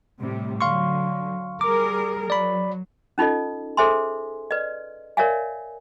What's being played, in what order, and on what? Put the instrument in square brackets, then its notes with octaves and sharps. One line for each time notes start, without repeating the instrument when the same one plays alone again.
[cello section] A2 C3 G3
[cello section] D3 F#3 [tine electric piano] F5 C6 C#6
[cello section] G3 G#4 A#4 [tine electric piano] D6
[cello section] F#3 [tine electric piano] D5 B5
[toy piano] C#4 D#4 F4 A4 D#5
G#4 A4 C5 E5 G#5 C6
B4 D5 D#5
A#4 C#5 D5 E5 F5 G#5